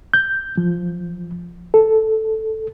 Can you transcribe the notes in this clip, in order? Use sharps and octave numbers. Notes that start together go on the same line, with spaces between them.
G6
F3
A4